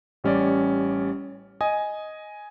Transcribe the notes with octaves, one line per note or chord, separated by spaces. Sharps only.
A1 G3 C#4 C#5 D5
D#5 G#5 D#6